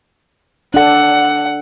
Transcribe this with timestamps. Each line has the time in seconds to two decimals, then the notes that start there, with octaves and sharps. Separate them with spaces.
0.74 D4 A4 F#5